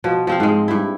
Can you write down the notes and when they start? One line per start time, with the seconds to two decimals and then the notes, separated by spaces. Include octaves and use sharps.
0.04 B2 F3
0.27 F3 C4 F5
0.40 G#2 G#3
0.68 G2 E4